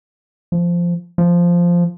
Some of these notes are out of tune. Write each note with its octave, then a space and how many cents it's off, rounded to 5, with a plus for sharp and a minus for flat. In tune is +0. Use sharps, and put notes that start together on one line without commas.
F3 -10
F3 -5